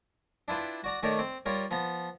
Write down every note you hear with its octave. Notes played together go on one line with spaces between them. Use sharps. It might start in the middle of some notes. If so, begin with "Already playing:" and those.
D4 E4 F4 B4 G5
F#4 D5 A#5
D#3 A3 A4 A#4 C#5 D5
C4
G3 F4 A#4 C#5
F3 B3 A#5